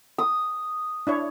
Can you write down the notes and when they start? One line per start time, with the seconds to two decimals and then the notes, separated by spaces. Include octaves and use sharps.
0.18 D#6
1.07 D4 E4 C#5